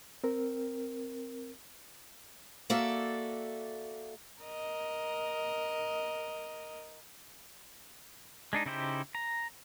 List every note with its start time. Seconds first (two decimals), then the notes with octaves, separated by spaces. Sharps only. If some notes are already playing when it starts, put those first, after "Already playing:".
0.24 C4 A#4
2.70 A#3 F#4 A4 D5 E5
4.42 A#4 D#5
8.53 G#3 D4 D#4
8.66 C#3 D#4 E4 G4 C5
9.15 A#5